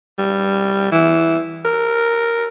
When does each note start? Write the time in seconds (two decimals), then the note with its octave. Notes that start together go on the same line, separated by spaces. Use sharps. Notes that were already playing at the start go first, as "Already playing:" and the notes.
0.18 G3
0.92 E3
1.65 A#4